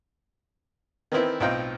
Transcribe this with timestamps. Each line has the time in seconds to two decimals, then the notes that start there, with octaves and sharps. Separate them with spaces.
1.12 D#3 E3 B3 C4 E4
1.40 B1 A2 C4 D#4 F4 G5